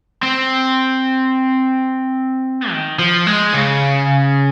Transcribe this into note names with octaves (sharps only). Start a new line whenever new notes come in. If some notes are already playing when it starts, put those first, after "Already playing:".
C4
D#3
F3
G#3
C#3